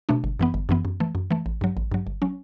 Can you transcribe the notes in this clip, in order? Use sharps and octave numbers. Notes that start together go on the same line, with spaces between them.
B2 A3 D4
G1
F#2 E3 B3
G1
F#2 E3 B3
F#2
E3 A3
F#2
E3 A3
A1
G2 F#3
A1
G2 F#3
G1
F#3 C#4